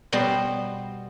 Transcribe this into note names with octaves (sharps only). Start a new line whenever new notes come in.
B2 G3 B3 C5